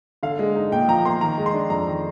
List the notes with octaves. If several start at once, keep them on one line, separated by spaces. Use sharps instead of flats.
D3 F5
G#3
D#4
A#2 G5
F3 A#5
A#5
A#3 C6
D#3 A#5
G#3
C6
D4
F2 A#5
D#3